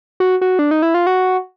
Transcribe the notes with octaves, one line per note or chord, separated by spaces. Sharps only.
F#4
F#4
D4
D#4
E4
F4
F#4